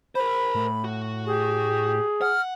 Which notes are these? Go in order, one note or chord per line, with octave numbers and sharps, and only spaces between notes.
A#4 C5 B5
A2
F#4
G4 G#4
F#5 F6